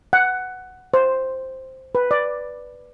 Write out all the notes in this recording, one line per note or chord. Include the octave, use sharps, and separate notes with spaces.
F#5
C5
B4
D5